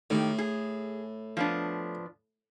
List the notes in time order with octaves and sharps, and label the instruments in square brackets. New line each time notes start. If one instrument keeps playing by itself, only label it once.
[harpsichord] A2 [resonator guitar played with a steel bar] D#3 G4
[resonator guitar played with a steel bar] G#4
F3 B3 D4